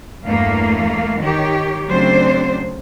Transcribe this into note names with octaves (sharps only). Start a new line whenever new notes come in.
E2 G2 A3 A#3 F5
D#3 G4 C#5
C#3 F#3 A3 C4 D4 C5